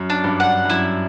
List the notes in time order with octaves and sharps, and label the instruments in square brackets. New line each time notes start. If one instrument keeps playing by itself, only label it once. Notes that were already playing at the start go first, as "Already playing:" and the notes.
Already playing: [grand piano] F#2
[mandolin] D4
[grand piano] G2
[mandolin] F#5
[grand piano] G2
[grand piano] F#2 [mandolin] E4